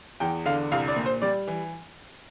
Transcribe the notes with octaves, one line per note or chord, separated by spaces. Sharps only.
E2 G5
D3 F5
C2 F5
D5
A#2
C5
G3 D5
E3